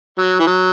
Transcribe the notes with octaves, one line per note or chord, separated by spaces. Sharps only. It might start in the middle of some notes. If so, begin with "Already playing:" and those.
F#3
E3
F#3